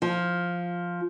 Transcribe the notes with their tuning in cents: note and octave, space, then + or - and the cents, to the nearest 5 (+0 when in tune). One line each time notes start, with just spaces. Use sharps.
F3 +5